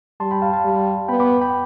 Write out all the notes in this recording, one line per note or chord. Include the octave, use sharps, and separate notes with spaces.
G3 A5 C6
G5 B5
F5 A5
F5 A5
G3
B3 G5 B5
B5 D6
G5 B5